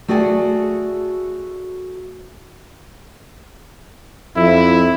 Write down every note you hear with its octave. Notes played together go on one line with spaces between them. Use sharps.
A3 F#4 G#4 D5 G5 G#5
F2 E4